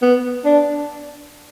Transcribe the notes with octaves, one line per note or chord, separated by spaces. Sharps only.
B3
D4